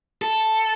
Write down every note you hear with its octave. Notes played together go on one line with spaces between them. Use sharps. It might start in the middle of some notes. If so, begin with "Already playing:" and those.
A4